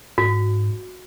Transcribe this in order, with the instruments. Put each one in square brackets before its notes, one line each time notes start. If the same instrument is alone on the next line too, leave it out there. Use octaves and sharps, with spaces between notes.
[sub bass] G#2 [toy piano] F#4